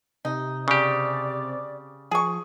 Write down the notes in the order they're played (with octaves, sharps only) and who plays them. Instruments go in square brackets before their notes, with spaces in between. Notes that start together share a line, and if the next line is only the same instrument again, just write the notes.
[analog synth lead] C3 [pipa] D#4
[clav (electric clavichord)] C#3 G4 [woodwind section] D5
[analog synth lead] F3 [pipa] G#4 C#6